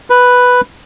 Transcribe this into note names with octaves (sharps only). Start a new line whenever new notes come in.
B4